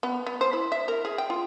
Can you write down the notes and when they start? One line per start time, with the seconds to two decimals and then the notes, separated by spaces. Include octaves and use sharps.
0.03 B3
0.26 B3
0.41 C5
0.53 E4
0.72 E5
0.88 A#4
1.05 G#4
1.18 G5
1.30 F4